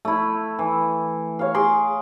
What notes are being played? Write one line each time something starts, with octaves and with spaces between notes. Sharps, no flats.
A3 E4
E3
C#5 F5
G#4 C6 D6